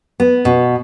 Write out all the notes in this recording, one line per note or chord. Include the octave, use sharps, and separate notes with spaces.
B3
B2